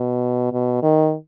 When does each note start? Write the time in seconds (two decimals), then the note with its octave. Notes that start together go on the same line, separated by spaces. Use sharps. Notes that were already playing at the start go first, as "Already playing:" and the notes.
Already playing: B2
0.52 B2
0.83 D#3